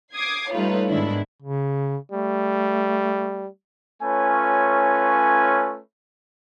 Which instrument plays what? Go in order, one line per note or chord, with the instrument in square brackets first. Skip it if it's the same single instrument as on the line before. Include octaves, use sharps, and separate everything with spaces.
[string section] D6 D#6 G#6 C7
G3 A3 D#4 F4 B4 C#5
G#2 D#3 G#3 B3 D4 E4
[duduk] C#3
[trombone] G3 [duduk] A3
[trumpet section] A3 C#4 F4 B4 C#5 G#5